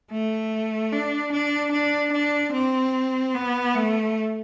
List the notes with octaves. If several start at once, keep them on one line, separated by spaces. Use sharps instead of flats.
A3
D4
D4
D4
D4
C4
B3
A3